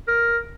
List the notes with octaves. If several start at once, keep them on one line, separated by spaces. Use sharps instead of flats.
A#4